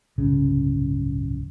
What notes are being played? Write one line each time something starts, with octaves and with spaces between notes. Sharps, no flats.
D1 G1 C2 C#3